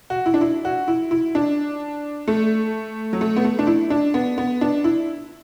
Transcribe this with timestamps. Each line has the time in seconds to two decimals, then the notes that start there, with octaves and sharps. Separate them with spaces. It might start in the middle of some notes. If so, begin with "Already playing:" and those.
0.10 F#4
0.26 E4
0.34 D4
0.41 E4
0.65 F#4
0.88 E4
1.11 E4
1.35 D4
2.28 A3
3.13 F#3
3.21 A3
3.36 B3
3.44 A3
3.59 D4
3.67 E4
3.90 D4
4.14 B3
4.38 B3
4.61 D4
4.84 E4